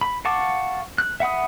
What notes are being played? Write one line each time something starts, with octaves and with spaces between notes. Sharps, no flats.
B5
F5 F#5 A5 C#6 D6
F#6
E5 F#5 B5 D#6